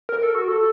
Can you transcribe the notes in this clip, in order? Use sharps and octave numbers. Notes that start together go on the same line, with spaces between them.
A#4
A4
F#4
A4